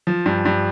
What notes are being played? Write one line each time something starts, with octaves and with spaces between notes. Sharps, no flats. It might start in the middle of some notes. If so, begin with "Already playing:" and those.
F3
G2
G2